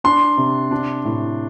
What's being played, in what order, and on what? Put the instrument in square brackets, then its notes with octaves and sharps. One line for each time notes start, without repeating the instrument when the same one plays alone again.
[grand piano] D4 C6
C3
D4
A2